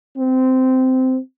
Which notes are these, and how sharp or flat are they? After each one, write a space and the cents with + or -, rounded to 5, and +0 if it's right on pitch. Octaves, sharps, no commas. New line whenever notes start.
C4 -15